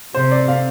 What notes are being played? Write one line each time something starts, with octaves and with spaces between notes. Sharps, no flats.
C3 C5
D5
F5